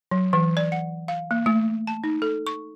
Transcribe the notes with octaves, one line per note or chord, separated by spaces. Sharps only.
F#3
E3
D5
F#5
F5
A#3
A3
A5
D#4
A4
C#6